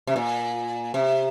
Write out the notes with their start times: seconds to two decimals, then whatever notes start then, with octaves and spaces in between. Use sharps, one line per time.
0.07 C3
0.16 A#2
0.94 C3